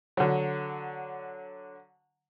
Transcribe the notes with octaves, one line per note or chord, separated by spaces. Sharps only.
D3 F#3